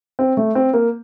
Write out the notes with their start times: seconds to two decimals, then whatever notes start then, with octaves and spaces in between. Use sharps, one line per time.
0.19 C4
0.37 A3
0.55 C4
0.73 A#3